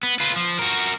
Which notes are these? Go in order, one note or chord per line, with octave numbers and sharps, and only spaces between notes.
B3
F4 B4
F3
F#4 A#4